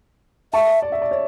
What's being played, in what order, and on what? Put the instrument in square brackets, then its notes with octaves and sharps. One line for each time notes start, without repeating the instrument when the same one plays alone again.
[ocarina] E5 [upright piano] A5 C#6
[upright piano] D5
E5
D5
C#5